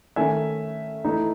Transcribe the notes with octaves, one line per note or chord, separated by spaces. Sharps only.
D#3 A3 C#4 E5 G#5
E3 A3 D#4